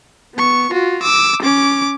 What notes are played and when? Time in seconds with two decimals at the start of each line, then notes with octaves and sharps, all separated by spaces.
0.34 B3 C#6
0.71 F4 F#4
1.02 D6 E6
1.42 C#4 D6